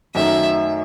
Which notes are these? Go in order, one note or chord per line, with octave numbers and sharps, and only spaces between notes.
F#2 D#3 F#3 A3 E5